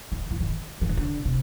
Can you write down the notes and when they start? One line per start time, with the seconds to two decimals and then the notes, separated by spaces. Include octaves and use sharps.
0.12 D#3
0.31 E3
0.40 D#3
0.81 E3
0.89 D#3
0.97 D3
1.25 C3